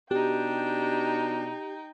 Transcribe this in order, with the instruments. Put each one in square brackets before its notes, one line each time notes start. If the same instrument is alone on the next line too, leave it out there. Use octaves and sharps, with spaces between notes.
[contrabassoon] B2 [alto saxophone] D4 [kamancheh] D#4 G5 [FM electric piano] G4